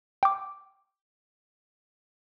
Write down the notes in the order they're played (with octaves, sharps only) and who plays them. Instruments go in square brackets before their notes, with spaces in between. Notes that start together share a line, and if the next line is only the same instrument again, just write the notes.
[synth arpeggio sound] G5 D6